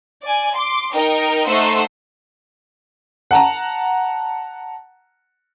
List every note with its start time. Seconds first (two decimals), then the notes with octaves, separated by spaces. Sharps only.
0.23 D5 G#5
0.55 C6 D6
0.94 D#4 A#4 D#5 G5
1.47 A3 D#4 C5 F#5 C6 E6
3.31 F#5 A5 A#5